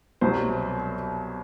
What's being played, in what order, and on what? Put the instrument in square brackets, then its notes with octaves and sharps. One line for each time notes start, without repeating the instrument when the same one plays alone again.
[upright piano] C2 B2 F#3 C5